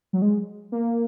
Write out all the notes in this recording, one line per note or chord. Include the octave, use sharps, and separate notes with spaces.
F#3
G#3
A#3